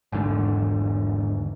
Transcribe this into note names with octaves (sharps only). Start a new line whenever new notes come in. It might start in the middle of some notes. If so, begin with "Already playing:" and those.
G#1 E2 G#2 D3